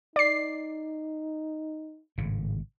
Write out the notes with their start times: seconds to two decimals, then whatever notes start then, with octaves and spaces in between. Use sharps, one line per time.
0.16 D#4 D5 C7
2.18 G#1 A2 C#3